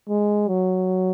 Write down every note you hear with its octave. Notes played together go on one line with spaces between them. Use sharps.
G#3
F#3